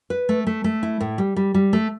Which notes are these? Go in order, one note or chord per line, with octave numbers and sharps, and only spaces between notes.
B4
A3
A3
A3
E4
A2
G3
G3
G3
A3